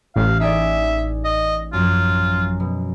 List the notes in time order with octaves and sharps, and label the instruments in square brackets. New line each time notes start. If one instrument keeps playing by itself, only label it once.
[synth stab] A1 [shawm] F5
[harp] D#4 G#4 D5 [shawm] E5
[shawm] D#5
[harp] F#2 F3 [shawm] F4
[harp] B2